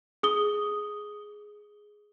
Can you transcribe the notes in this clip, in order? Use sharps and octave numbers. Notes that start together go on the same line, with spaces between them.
G#4 D#6 G7